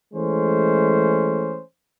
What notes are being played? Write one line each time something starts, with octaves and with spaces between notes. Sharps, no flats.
E3 G#3 A3 C#4 C5